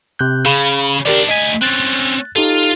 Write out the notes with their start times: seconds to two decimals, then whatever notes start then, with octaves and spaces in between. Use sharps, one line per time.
0.19 C3 F#6 G6
0.45 C#3 G#4 F5 B5
1.05 D#2 D4 G4 A#4 D5
1.29 D2 D#5 G#5 B6
1.62 C4 C#4 F#6 A6
2.36 D#4 F4 G4 A4